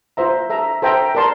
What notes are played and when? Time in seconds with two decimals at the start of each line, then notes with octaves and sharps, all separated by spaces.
0.17 F4 C5 E5 A#5
0.50 A4 E5 A#5
0.82 A4 C5 E5 G5 A#5
1.15 A#4 D5 A5 C6